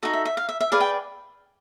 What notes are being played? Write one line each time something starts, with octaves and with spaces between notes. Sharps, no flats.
D#4 F#4 A4 D#5
E5
E5
F5
E5
E5
G#4 B4 D5 F5
G5